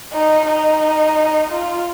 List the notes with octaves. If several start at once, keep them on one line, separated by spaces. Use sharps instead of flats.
D#4
D#4
F4